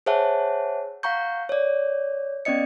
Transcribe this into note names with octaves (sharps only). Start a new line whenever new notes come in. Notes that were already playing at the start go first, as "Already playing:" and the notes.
G#4 C5 C#5 E5 F#5 A5
F5 F#5 A#5 C#6 G6
C#5 D5
B3 C#4 D5 D#5 C#7